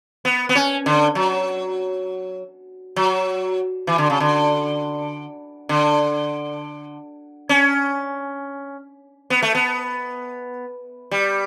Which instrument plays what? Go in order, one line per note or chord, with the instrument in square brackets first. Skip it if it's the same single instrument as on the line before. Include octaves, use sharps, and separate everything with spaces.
[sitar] B3
B3
C#4
D3
F#3
F#3
E3
D3
C#3
D3
D3
C#4
B3
A3
B3
G3